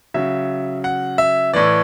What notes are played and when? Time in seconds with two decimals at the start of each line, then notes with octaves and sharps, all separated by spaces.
0.14 C#3 F#3 E5
0.84 F#5
1.18 E5
1.53 A2 E3 D5